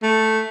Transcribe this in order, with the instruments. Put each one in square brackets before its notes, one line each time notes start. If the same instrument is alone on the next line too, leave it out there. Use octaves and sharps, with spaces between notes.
[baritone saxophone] A3